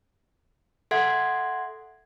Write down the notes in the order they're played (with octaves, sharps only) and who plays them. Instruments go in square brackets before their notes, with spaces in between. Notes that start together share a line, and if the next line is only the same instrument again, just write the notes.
[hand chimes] A4 E5 F#5 C6 G#6